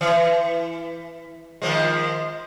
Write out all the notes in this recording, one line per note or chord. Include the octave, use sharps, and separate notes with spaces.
E3
D#3 F3 G#3